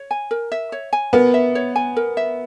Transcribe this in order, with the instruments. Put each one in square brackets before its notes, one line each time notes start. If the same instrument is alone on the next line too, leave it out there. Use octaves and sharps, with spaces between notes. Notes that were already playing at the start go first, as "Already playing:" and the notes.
Already playing: [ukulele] C#5
G#5
A#4
E5
C#5
G#5
[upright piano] B3 [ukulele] A#4
[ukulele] E5
C#5
G#5
A#4
E5